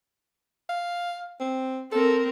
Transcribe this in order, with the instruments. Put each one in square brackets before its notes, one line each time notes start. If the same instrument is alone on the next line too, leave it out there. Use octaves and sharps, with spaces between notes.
[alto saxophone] F5
C4
[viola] C4 A#4 [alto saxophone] A4